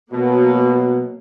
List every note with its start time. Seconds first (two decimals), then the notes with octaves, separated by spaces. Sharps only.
0.12 B2 F#3 A#3